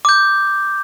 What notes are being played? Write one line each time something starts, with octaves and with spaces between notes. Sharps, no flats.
D6 G6